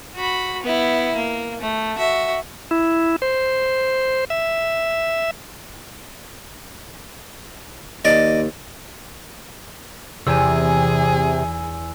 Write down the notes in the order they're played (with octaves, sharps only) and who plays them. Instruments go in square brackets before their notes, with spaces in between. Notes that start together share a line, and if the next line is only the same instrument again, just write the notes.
[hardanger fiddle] F#4 B5
B3 E4
A#3
A3
F#4 E5
[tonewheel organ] E4
C5
E5
[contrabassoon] D#2 [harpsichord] D5 D#5
[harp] E2 [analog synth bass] C3 [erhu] G#4 [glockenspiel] G#5 E6